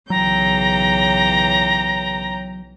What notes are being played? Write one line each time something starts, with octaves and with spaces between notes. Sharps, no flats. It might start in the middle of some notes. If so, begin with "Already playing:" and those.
B1 C#3 E3 F#3 G5 A#5